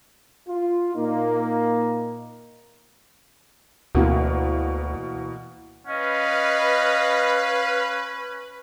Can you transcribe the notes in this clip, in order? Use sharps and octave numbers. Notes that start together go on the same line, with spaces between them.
F4
A#2 A#3 D#4
D2 B2 E3 A#3
C#4 B4 D#5 F5